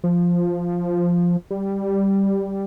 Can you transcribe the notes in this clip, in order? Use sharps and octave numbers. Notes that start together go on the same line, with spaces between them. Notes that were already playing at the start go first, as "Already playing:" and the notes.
F3
G3